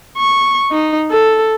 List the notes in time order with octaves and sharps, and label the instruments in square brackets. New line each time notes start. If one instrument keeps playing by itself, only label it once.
[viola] C#6
D#4
A4